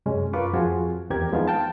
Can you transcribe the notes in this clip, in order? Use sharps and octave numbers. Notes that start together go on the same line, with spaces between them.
F#2 C3 G#3 C#4
F#2 F4 A#4 B4 C#6 D6
F2 F3 F4 F#4 G#4 G#5
E2 C4 G4 A#4 G#6
F3 G#3 B3 D#4 F4
F5 G5 A5